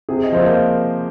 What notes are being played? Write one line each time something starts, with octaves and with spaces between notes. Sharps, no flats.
C3 G#4
D#5
F3 A#3 C5
A#4